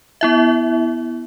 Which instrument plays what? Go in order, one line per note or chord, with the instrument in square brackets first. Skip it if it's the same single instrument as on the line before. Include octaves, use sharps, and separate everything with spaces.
[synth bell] B3 E4 E5